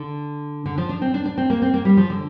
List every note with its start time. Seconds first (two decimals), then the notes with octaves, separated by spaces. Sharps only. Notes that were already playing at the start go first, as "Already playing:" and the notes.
Already playing: D3
0.66 D3
0.78 F3
0.89 D4
1.02 C4
1.14 D4
1.25 D4
1.38 C4
1.50 A#3
1.62 C4
1.74 A#3
1.85 G3
1.97 F3
2.10 D3